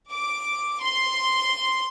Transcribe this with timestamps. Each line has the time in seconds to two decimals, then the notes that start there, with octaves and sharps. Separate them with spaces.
0.13 D6
0.83 C6